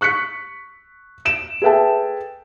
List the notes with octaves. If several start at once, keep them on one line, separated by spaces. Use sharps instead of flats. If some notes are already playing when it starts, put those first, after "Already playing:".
C#6 F#6 B6 C#7
D7 E7
G#4 A4 B4 E5 G5 A5